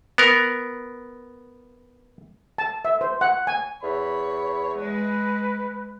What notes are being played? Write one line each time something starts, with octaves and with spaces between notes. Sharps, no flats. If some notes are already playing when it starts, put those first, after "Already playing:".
B3 A#4
A5
E5
C5
F#5
G#5
E2 C#5 B5
G#3 B4